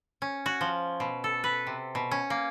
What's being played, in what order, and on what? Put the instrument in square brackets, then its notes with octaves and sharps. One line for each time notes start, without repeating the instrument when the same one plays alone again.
[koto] C#4
F#4
F3
B2
A4
B4
C3
B2
C#4
A#3